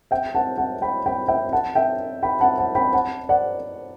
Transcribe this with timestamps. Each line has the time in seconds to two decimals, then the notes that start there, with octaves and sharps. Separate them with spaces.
0.11 E5 G5
0.35 F#5 A5
0.58 F#5 A5
0.82 G5 B5
1.06 G5 B5
1.28 E5 G5
1.52 F#5 A5
1.75 E5 G5
2.23 G5 B5
2.40 F#5 A5
2.58 F#5 A5
2.75 G5 B5
2.93 F#5 A5
3.29 D5 F#5